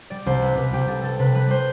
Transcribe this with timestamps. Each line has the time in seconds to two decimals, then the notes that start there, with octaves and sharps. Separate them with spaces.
0.10 G3 D5
0.26 C2 C5
0.42 G3 B4
0.57 C2 B4
0.73 C2 G4
0.88 C2 A4
1.03 G3 A4
1.19 C3 B4
1.35 G3 B4
1.50 G3 C5